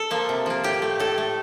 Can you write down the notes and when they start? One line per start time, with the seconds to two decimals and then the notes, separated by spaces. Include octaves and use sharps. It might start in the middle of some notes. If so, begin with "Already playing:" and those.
Already playing: A4
0.11 F3 A#3
0.29 C3
0.46 F3 A#3
0.64 A2 G4
0.82 A3
1.00 A2 A4
1.18 A3